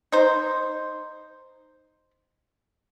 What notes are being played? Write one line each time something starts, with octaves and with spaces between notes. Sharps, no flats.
D#4 C5